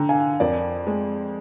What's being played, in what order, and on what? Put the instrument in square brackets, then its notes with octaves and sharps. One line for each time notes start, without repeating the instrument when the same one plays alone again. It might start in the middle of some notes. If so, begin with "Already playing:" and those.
Already playing: [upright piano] D3 [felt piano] G5 A#5
[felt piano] F5 G#5
[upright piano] F2 [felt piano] A#4 D5
[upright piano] G#3